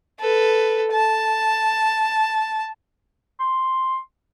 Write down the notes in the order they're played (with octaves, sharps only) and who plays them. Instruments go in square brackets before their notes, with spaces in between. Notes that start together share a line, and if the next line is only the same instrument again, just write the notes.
[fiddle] A4 B4
A5
[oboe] C6